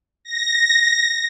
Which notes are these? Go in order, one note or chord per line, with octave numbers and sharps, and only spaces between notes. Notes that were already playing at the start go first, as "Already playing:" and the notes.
A#6